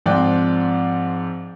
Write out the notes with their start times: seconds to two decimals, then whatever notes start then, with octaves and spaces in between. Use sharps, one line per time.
0.06 G#2 F3 C4 D5 G5 F#6